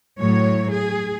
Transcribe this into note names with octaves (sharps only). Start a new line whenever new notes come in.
A2 F#3 C#5
G#4